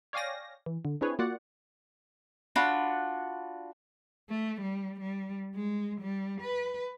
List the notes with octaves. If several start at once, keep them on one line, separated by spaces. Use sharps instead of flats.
C#5 D5 F5 G5 G#5 A#6
E3
D3
C4 D4 E4 G#4 B4 C#5
A#3 F4 F#4 D5 F#5
D4 F4 F#4 B5
A3
G3
G3
G#3
G3
B4